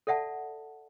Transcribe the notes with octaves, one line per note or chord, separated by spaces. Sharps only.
A4 D5 E5 F#5 A5